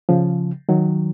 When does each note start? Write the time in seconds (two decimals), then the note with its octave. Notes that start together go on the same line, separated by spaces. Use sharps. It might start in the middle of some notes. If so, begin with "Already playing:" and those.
0.09 C#3 F3
0.69 D#3 F#3